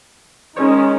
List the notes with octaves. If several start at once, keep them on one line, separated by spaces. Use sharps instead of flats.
D#3 G#3 C#4 C#5